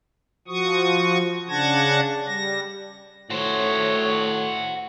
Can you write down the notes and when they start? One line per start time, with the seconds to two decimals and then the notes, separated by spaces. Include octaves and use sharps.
0.48 F3 F#4 C#6 D#6
1.49 C#3 D4 F#5 A5 G#6 A#6
2.26 G3 A#6
3.30 A2 F#4 C5 C#5